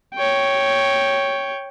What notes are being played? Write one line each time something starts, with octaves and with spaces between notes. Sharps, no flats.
C#5 G5